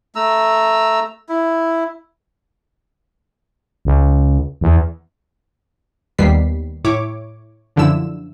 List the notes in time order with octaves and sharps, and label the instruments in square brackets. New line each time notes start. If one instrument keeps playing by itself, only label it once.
[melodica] A3 A#5 E6
E4
[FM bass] C#2
E2
[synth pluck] D#2 G3 B3 B6 C7
A2 E4 C#5 D6
F#2 D3 F3 E4 E6 E7